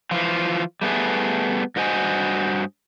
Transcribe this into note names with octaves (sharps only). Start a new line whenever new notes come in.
E3 F3 F4
G3 A3 B3 G#4
G2 F#4 C5 D#5 G#5